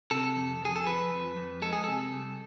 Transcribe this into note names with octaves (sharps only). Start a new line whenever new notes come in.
C3 A4
F2
F2 G#4
A4
F3 B4
F2
F2
G#3 A4
G#4
C3 A4
C2